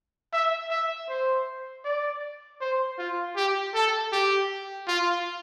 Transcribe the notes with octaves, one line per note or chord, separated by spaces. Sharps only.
E5
E5
C5
D5
C5
F4
G4
A4
G4
F4